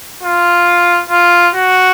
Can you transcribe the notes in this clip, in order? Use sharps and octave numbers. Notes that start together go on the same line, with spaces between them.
F4
F4
F#4